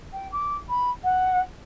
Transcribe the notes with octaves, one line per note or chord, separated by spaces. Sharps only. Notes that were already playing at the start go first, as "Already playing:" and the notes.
G5
D6
B5
F#5